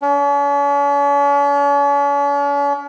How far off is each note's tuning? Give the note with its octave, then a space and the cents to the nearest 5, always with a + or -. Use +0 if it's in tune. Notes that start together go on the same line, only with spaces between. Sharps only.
C#4 +45